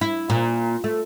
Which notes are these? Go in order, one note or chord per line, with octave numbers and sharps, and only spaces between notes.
E4
A#2
A3